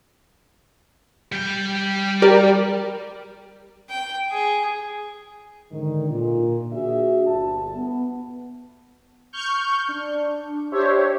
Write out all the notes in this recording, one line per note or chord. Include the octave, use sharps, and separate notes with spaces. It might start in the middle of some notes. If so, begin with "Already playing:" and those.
G3 G5
G4 A#4 D5
G5
G#4
G#2 D3 D#3
A#2
D4 F#4 G#4 E5
G1 A5
B3
C#6 F6 G6
D4
D4 G4 C5 C#5 E5